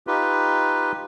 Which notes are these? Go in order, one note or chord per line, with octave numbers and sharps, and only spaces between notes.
D#4 F4 G4 B4